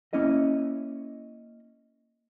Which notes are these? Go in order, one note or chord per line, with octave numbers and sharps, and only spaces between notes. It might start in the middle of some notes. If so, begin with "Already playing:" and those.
A#3 C#4 E4 D#5